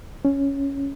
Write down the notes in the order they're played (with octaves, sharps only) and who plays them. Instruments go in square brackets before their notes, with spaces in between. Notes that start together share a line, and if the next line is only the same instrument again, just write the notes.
[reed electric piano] C#4